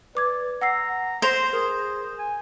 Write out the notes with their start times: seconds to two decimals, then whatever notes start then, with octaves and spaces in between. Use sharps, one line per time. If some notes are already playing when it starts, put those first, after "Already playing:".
0.15 B4 D5 D6 G#6
0.61 F#5 A#5 E6 C7
1.22 C5 C6 A#6 E7 F7
1.53 G#4 A#4
2.18 G#5